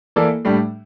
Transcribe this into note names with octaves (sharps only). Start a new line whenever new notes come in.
E3 A#3 E4 A4 D5
A2 G3 D4